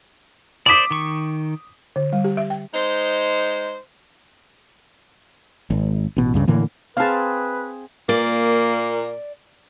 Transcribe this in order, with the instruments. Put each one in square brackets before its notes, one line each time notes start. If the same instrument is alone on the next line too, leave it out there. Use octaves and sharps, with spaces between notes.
[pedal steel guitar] C5 D5 [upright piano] D6 D#6 B6
[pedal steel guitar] D#3 C#6
[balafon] D3
G3
G4
E5
G5
[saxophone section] G#3 D#4 C5
[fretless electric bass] G#1
A1 B2
C#2 G2 C#3
A2 D3 E3 A#3
[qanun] C4 G#4 [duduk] B4 [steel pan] F5 A5
[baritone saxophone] A#2 [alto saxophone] A#3 [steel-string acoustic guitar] D5